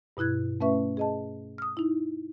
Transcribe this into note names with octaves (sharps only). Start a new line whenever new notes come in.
G2 B2 E4 F#6 G#6
A3 C#4 B4 E5 C#6
G#4 D#5 A5
D#6 F6
D#4 E4